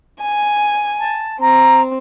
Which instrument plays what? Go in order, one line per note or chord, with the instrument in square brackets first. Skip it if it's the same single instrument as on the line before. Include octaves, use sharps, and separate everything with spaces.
[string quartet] G#5
[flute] A5
[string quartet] C4 [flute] A#5